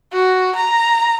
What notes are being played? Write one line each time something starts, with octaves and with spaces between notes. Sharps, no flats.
F#4
A#5